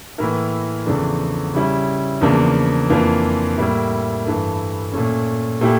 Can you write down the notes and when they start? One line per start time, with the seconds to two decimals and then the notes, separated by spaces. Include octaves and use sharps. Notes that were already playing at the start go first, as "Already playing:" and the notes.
0.18 A2 E3 A#3 E4 A#4
0.86 E2 C#3 F3 A3 D4
1.54 C#3 G3 C#4 E4
2.21 E2 C#3 F3 A#3 D4
2.89 F2 E3 A#3 D4 F4
3.58 A2 G3 A#3 E4
4.26 G2 E3 A3
4.92 A#2 A3 C#4
5.61 A#2 A3 E4 G4